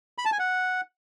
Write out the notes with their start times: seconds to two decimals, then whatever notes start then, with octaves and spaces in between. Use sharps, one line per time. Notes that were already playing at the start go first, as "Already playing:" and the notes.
0.18 B5
0.25 A5
0.32 G#5
0.39 F#5